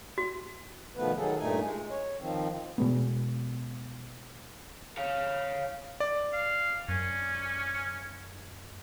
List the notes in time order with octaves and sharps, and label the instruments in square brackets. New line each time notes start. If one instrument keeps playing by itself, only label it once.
[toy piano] F#4
[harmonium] B2 D#3 F3 A3 B3 B4
D#3 F#3 G#4 A4
G2 A#2 A3 D#4 G#5
G#3
C#5
D#3 F3 C4
[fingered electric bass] B2 G#3 B3
[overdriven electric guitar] C#5 F5
[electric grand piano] D5
[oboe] F5
[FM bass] F#2 [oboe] C#4